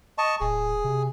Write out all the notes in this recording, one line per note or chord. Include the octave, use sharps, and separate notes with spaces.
D#5 A5 C#6
D1 G#4
C3